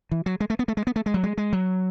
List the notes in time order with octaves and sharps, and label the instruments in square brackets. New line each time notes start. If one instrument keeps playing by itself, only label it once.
[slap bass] E3
F#3
G#3
A3
B3
A3
G#3
B3
A3
G#3
F#3
G#3
G#3
F#3